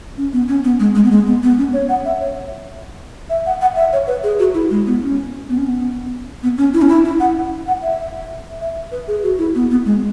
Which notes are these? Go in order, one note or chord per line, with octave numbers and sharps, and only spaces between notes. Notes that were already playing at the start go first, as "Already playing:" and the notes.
C#4
B3
C#4
B3
G#3
G#3
B3
G#3
B3
B3
C#4
C#5
F#5
E5
C#5
E5
F#5
F#5
E5
C#5
B4
G#4
F#4
E4
G#3
B3
C#4
B3
C#4
B3
B3
C#4
E4
C#4
E4
E4
F#5
F#5
E5
E5
B4
G#4
F#4
E4
B3
B3
G#3